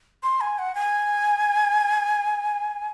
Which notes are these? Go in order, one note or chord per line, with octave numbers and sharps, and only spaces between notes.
C6
G#5
F#5
G#5